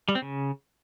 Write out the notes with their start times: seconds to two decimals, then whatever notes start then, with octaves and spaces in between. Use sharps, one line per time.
0.08 G3
0.15 C4
0.22 C#3